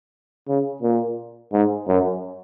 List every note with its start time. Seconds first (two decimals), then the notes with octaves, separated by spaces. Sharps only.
0.48 C#3
0.82 A#2
1.52 G#2
1.88 F#2